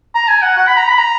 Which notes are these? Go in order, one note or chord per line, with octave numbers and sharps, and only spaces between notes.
A#5
G#5
F#5
F#5
B5
A#5
B5
A#5